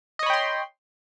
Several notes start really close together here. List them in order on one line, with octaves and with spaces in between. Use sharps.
D#5 C#5 B5 G5 C6